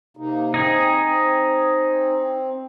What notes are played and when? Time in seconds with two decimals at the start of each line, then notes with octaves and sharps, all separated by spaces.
0.17 C3 A#3 D#4
0.54 C4 D#4 G#4
1.06 C4